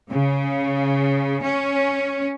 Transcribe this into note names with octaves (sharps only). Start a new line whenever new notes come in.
C#3
C#4